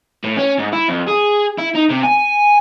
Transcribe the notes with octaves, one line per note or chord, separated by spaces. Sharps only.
A2
C#4
G#2
E4
F2
G#4
E4
D#4
C3
G#5